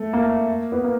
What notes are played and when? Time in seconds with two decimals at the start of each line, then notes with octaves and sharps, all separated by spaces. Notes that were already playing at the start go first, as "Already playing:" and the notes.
Already playing: A3
0.13 A#3
0.72 B3
0.84 A#3